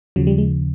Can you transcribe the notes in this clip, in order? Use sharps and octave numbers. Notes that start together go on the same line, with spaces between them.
D#2 C#3 F3 F#3
G3
G#3